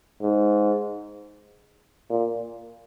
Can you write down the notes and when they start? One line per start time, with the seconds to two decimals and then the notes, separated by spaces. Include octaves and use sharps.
0.22 G#2
2.10 A#2